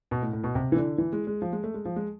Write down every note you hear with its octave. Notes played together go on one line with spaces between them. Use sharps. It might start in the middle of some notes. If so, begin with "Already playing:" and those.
B2
A2
A2
B2
C3
E3
D3
E3
G#3
G#3
F3
G#3
A3
G#3
F3
G#3